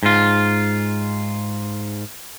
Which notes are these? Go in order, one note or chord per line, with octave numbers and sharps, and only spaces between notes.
G#2 F4